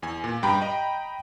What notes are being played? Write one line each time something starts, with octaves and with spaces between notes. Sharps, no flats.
E2 G#5
A#2
G2 G5 A#5 B5
D#5